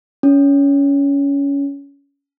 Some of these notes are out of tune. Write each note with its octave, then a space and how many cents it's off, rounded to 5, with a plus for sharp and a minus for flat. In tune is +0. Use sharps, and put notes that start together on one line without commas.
C#4 +20